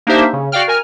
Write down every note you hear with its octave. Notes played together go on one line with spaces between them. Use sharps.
A#3 D4 D#4 G4 C5 E5
C#3
F#4 D5 F5 G5 F6
A#4 G#5 F6